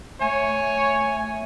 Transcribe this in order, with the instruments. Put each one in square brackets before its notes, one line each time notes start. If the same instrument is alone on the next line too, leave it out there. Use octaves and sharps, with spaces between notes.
[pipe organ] A3 [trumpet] C#5 [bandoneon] G#5